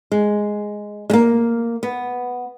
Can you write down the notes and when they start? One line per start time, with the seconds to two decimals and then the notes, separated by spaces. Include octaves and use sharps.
0.12 G#3
1.10 G#3
1.13 A#3
1.83 B3